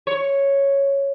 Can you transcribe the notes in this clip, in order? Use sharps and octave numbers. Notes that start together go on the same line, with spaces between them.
C#5